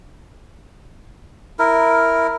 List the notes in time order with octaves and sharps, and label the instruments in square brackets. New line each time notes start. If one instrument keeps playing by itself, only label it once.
[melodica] E4 A#4